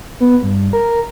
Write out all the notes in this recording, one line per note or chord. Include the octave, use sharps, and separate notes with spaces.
B3
G2
A#4